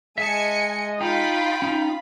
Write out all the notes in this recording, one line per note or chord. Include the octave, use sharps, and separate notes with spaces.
G#3 D#5 E5 G#5 A5 C#7
D#4 F4 G5 B5
C#4 D#4